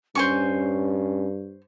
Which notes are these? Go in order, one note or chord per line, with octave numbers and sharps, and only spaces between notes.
G2 C#4 C5 G#5 C#6